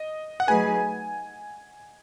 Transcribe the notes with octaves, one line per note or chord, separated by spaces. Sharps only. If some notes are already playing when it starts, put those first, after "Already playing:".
Already playing: D#5
F#5
F#3 A3 D#4 G#4 B4 G#5